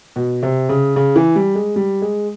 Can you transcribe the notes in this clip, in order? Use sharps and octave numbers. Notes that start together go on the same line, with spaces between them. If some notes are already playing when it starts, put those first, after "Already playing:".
B2
C3
C#3
C#3
E3
G3
G#3
G3
G#3